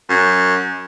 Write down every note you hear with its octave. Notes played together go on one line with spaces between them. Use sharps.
F#2